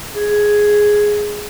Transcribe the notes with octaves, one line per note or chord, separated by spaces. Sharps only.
G#4